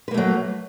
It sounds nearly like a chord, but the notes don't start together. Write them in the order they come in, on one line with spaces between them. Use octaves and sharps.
B4 A#3 A3 F#3